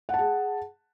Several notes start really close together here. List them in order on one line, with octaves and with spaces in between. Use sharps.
F#5 A5 G#4